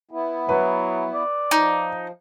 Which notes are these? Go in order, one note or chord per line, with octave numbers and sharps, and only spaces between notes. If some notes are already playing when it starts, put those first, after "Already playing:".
B3 E4
F#3 B4
D5
F3 D#4